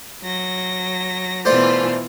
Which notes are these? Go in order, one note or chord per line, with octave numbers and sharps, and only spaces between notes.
F#3 A#6
B2 E3 A3 F4 C5 D5